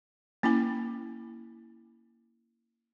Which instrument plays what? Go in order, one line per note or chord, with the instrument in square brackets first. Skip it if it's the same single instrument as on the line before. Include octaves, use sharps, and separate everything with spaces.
[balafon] A#3 C#4 E4 G5 G#5